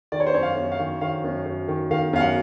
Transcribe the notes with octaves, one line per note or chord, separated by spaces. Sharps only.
D#3 D5
C#5
C5
F#2 C#5
F5
F#2
F5
D#3
D#3 F5
F#2
F#2
D#3
D#3 F5
F#2 F5
F#5